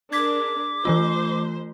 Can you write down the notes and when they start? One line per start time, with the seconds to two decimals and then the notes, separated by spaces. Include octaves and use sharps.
0.13 D4 G#4 A#4 D6 G#6 B6
0.85 E3 A3 F4 C5